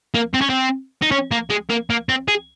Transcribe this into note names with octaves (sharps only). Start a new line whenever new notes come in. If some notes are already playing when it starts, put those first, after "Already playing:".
A#3
C4
C#4
C4
D#4
C#4
A#3
G#3
A#3
A#3
C4
G#4